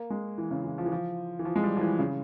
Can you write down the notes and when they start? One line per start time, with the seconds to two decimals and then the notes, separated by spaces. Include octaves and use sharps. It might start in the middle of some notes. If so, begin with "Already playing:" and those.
Already playing: A#3
0.10 G#3
0.38 E3
0.51 C#3
0.64 E3
0.78 F3
0.86 E3
0.92 F3
1.39 E3
1.45 F3
1.56 G#3
1.64 G3
1.77 F3
1.81 E3
1.99 C#3